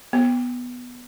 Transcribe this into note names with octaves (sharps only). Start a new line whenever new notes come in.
B3